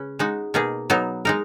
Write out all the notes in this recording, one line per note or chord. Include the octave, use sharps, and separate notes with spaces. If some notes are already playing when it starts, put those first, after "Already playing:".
Already playing: C#3 C#4 B4
G#3 D#4 F#4
B2 A#3 D#4 G#4
F#3 B3 D#4
G#3 D#4 A#4